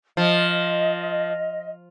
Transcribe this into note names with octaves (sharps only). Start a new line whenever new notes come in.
F3 D#5